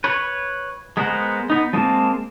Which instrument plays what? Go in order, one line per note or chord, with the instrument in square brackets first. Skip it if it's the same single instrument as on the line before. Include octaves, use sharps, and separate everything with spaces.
[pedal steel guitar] B4 C#5
G#3 B3 A#4 C5 F#5
B3 D#4
F3 G#3 A#3 C4 A5